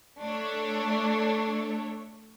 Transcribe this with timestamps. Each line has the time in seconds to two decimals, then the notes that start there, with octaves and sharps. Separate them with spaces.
0.22 A3 D4 C#5